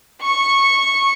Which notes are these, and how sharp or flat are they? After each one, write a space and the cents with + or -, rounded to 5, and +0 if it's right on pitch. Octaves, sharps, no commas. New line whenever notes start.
C#6 -10